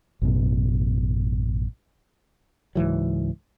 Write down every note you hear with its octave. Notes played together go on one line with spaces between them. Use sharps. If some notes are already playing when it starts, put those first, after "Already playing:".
A1 F#2 B2
C#2 G#2 E3 F#3